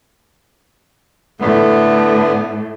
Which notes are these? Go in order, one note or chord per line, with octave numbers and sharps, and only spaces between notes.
A2 D3 B3